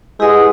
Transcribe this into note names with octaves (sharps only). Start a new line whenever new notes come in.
G#3 E4 G4 B4 D#5 F#5